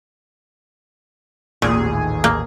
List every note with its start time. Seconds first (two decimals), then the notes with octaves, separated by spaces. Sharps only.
1.62 A1 D#2 A#2 G#4
2.24 A#3